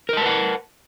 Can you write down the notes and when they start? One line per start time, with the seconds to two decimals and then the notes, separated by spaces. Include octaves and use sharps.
0.09 A#4
0.13 D#5
0.17 A5
0.21 B4
0.26 F#5